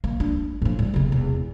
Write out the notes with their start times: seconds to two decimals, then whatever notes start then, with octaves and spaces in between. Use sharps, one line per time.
0.04 A#3
0.20 D4
0.62 A2 F3
0.79 G3
0.94 E1 C3
1.12 E2